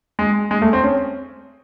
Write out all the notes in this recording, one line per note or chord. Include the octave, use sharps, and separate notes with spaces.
G#3
G#3
A3
C4
C#4